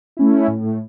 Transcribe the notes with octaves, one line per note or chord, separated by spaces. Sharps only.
A3 C#4 E4
A2